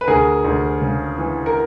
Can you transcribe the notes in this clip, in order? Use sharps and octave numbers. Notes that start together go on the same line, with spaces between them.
B4
D2 G#4 A#4
D2
C#3
E3
A#4